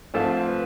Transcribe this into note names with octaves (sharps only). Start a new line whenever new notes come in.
G#2 F3 A3 C4 F4 A4
B4